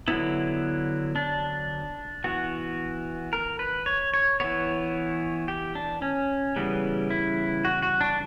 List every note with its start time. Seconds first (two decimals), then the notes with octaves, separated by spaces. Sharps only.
0.08 D3 F#3 B3 E4
1.16 D4
2.24 E3 B3 F#4
3.33 A#4
3.59 B4
3.86 C#5
4.14 C#5
4.40 E3 B3 C#5
5.48 G4
5.75 D4
6.02 C#4
6.56 C#3 E3 G3 B3
7.10 E4
7.65 F#4
7.83 F#4
8.01 D4